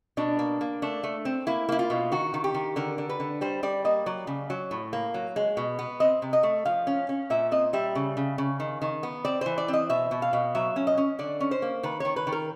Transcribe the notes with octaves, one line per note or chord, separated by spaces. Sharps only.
B2 D4
A#3
A#3
A3 D4
A3
C4
A#3 E4
A#3 E4
F4
B2
D#3 F#4
D#3
G4
D#3
D3 A#4
D3
B4
D3
G3 C5
G3 D5
A#3 D#5
F#3 D5
C#3
F#3
A2
A#3
F#3
G#3
B2
B3
C4 D#5
C3
D#5
A3
F3 F5
C#4
C#4
A#2 E5
C4 D#5
G3 E5
C#3
C#3
C#3
D#3
D#3
B3
C4 D5
E3 C5
D5
C4
D#5
B2 E5
B2
F5
B2
F#3 E5
C#4
D#5
C#4
D3 D5
C#4
C5
A#3
D#3 B4
D#3 C#5
B4
D#3
A#4